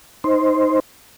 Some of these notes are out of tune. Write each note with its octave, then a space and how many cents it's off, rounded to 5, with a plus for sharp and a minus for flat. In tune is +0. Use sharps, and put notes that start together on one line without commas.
D#4 +5 C5 +0